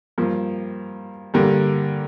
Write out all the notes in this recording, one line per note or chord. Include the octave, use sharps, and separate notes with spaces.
G2 F3 A#3
G2 D3 G3 A#3